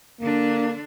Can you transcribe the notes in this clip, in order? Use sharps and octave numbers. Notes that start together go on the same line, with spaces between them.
D3 A#3 D4